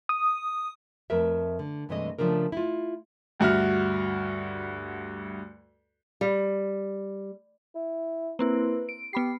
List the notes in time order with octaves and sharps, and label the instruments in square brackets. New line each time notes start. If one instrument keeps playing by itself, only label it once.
[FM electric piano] D#6
[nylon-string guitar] F2 A3 A#4 B4 E5
D3
G2 C3 E3 G#3 A3 D#5
C#3 F3 A3 D4 A#4
E4 F4
[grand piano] D2 G2 F#4 E5 F6
[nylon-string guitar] G3
[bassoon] E4
[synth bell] A#3 C4 E4 [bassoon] B4
[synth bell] D7
[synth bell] B3 B5 C7 [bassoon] G4